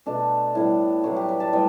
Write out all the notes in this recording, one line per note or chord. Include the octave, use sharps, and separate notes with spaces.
B2 A3 D4
A2 G3 B3 E4
A2 F#3 B3 F#4
G4
B4
A5
A2 G3 B3 G5